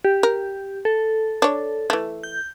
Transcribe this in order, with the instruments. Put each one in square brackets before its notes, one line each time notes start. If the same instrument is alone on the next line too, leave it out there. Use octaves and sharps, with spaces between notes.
[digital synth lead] G4
[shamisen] A#4
[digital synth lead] A4
[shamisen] D4 C#5
E3 A3
[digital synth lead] G6